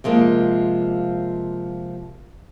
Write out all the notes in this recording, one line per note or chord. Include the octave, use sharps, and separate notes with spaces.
C3 F3 G#3 A#3